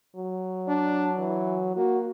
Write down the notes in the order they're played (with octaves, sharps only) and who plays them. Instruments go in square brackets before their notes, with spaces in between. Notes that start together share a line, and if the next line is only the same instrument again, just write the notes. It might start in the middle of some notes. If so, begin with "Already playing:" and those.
[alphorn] F#3
[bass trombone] D4
E3
[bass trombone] A#3 [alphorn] F#4